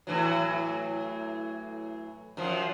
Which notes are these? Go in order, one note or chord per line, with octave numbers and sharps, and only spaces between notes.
A2 E3 F#3
F#2 F3